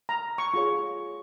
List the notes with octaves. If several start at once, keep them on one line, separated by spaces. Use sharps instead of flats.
A#5
C#6
F4 G#4 C#5 C#6